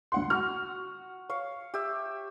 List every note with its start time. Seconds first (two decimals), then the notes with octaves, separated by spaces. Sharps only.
0.12 D2 F#5 C6
0.30 F#4 F6
1.30 C#5 F5
1.74 G4 E5